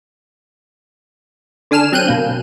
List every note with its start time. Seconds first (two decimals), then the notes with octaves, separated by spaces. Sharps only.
1.71 D3 D4 G#5 F6 E7
1.92 F#3 C4 F#6 G6 D#7
2.08 B2 A#3